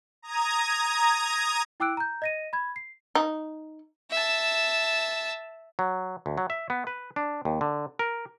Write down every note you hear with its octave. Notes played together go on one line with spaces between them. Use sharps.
A#5 D#6 G#6
E4 G5 D6 E6 F#6 D7
A#5 G6
D#5 A#6 D#7
B5 G#6
C7
D#4
E5 A5
F#3
D2
F#3
E5
B3
B4
D4
D#2
D3
A#4